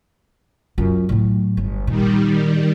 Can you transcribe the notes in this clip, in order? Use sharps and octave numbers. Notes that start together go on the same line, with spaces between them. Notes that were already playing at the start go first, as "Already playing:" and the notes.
F#2 F4
A2 F#3
G1
A#2 D#3 G3